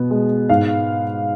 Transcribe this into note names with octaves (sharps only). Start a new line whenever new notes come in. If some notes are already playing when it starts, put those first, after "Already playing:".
Already playing: B2 B3
G#3
G#2 F5